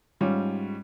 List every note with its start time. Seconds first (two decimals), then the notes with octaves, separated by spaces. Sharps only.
0.21 G#2 G3 C#4 F4